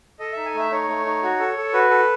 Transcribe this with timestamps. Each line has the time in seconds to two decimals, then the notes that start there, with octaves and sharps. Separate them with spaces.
0.19 A4 D#5
0.32 D#4 E5
0.45 G#5
0.54 A3 E5
0.71 D#4 C#5
0.88 A3
1.05 D#4
1.23 F#4
1.39 A4
1.56 A4
1.73 F#4 B4
1.90 A4